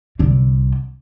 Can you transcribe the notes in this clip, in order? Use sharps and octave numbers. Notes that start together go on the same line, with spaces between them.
C2 D3